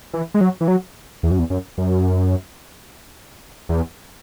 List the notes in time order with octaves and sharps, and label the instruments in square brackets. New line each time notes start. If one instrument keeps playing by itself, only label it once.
[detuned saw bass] E3
G#3
F#3
E3
F#3
E2
F#2
E2
F#2
F#2
E2